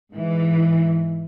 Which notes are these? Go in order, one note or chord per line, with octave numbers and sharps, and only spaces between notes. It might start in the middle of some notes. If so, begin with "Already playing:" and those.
G#2 E3